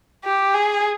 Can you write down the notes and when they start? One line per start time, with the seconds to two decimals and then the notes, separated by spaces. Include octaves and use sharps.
0.24 G4
0.54 G#4